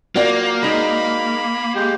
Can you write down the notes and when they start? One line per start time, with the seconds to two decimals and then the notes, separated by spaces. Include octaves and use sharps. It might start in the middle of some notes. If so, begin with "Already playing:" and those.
0.16 F#3 A#3 F4 F#4 D5 G5
0.63 G#3 D#4 G#4 B5
1.75 G#3 G4